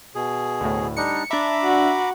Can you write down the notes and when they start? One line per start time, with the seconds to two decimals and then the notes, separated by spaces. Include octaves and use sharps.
0.15 B2 G#4
0.60 D2 A2
0.97 G3 D4 D#4 C#7
1.31 D4 E5 A#5 B5 D6
1.63 F#4